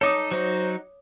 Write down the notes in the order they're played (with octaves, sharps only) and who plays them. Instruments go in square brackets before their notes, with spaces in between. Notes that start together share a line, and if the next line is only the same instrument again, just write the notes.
[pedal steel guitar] D#4 A4 [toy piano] C#5 D6 D#6
[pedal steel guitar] F#3 D#4 F#4 [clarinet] C5